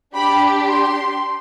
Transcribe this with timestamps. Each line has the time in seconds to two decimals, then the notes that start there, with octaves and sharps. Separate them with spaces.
0.15 D4 G4 B5
0.67 C6